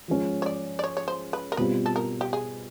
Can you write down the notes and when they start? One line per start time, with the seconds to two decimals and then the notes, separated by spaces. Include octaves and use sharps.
0.08 F3 G#3 C#4
0.42 C#5
0.46 D5
0.79 D5
0.84 C#5
0.97 C#5
1.08 C5
1.33 B4
1.52 A#4
1.57 B2 G3 C4 F4 B4
1.86 A4
1.96 A#4
2.21 G4
2.33 G#4